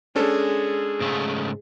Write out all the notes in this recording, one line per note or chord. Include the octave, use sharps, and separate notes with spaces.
G#3 C#4 D4 A4
G#2 C#3 A3